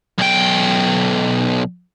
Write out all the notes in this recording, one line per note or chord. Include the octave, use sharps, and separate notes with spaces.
B1 G5